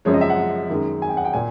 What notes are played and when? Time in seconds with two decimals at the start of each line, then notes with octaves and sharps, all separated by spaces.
0.05 F#2 C#3 F3 G#3 C#5
0.14 D#5
0.21 E5
0.30 F#5
0.70 F#2 D#3 G#3
1.02 G#5
1.09 G5
1.17 F#5
1.25 G5
1.33 A#2 G#5